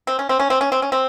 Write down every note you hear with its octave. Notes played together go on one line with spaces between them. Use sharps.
C4
C#4
C4
C#4
C4
C#4
C4
C#4
C4